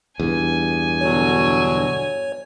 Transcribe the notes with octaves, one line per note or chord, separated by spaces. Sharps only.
E2 G2 G#5
B2 D3 F#3 C#5